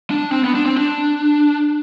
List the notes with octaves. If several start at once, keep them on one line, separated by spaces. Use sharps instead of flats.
D4
C4
B3
D4
C4
D4